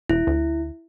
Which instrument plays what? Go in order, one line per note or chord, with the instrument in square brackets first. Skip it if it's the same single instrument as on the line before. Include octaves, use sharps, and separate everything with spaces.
[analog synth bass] E1 [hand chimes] E4
[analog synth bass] D2